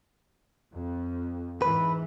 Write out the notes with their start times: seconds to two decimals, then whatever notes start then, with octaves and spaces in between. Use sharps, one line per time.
0.73 F2
1.62 G#2 E3 B4